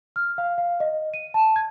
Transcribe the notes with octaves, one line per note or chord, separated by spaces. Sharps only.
F6
F5
F5
D#5
D#7
A5
G#6